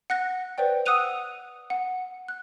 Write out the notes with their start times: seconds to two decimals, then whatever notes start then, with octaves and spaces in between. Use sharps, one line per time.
0.10 F#5 F#6 A#6
0.58 B4 C5 D5 G5
0.86 F#5 D#6 E6 F#6 D#7 F7
1.70 F#5
2.28 F#6